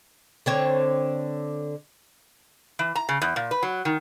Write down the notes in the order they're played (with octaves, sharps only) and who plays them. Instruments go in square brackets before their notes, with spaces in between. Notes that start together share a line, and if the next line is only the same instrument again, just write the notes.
[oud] D3 C4 C#5
[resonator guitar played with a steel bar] E3
A#5
C#3
E2
A#2
B4
F#3
D#3